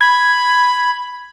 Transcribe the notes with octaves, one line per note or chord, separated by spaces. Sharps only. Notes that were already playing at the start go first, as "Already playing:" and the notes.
B5 G#6